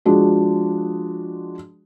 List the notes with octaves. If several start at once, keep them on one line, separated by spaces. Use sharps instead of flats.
F3 G#3 D4 F#4